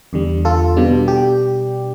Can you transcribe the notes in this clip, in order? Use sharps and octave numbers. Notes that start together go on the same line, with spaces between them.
E2 D3 G3
F4 A4
B2 G3 D4
G4